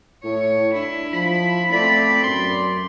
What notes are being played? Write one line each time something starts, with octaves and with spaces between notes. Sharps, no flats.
A2 C#5
D4 E4
F3 B5
A3 C4 D5 B5
F#2 C6